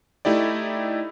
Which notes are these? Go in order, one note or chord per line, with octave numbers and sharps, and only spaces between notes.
A3 D#4 E4 G4 D5